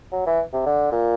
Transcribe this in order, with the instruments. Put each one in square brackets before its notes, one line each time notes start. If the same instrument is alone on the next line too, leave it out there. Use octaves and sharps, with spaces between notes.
[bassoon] F#3
E3
C3
D3
A#2